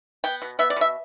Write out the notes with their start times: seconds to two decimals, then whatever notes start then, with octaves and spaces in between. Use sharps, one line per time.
0.24 B3 G5
0.42 B2
0.59 B3 E5
0.70 D5
0.76 B2 E5